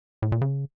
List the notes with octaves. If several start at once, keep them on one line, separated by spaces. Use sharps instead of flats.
A2
A#2
C#3